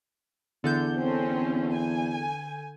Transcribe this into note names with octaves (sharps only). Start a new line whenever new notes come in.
E2 D3 A4 G6
C4 C#4
G#5